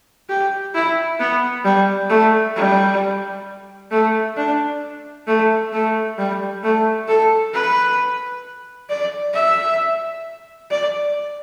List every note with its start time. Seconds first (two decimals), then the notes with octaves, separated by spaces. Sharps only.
0.29 G4
0.74 E4
1.20 B3
1.65 G3
2.10 A3
2.56 G3
3.92 A3
4.37 D4
5.27 A3
5.73 A3
6.18 G3
6.64 A3
7.08 A4
7.54 B4
8.89 D5
9.34 E5
10.71 D5